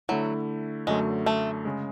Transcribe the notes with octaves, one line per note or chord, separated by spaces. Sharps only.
D3 F#3 A3 E4
F#2 D3 F#3 G#3 A3
A3
C#3 G#3